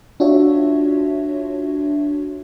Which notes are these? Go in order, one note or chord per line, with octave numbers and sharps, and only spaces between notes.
D4 F4 F#4 C#5 E5